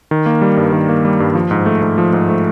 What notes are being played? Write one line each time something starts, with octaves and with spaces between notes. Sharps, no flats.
D#3
A#3
G3
G2
D#3
A#3
G3
G2
F3
G#2
A3
G#2
F3
G#2
A3